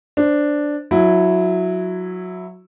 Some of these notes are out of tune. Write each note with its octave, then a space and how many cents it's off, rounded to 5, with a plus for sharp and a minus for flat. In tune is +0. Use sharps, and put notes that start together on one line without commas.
D4 +0 C5 +0
F#3 -15 E4 +0